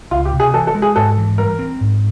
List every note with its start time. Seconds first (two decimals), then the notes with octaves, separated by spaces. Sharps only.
0.11 C#2 F4
0.25 G4
0.33 C3
0.40 G#4
0.54 E3 A4
0.67 A4
0.75 G#3
0.82 G#4
0.96 G#2 A4
1.18 E3
1.38 G3 A#4
1.59 C4
1.81 G#2